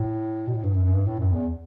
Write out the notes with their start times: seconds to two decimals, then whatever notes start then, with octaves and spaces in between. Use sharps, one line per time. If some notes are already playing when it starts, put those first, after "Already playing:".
Already playing: A2
0.48 B2
0.54 A2
0.63 G2
0.74 F#2
0.84 F#2
0.93 G2
1.06 A2
1.19 F#2
1.33 E2